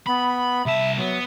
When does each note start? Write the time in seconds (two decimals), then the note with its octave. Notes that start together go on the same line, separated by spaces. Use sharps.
0.07 B3 B5
0.66 C2 E5 A5
0.97 F#3 B3